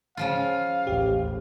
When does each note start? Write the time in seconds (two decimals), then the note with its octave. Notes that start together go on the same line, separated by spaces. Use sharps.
0.17 C#3 F3 F4 F5
0.87 A1 D#2 G4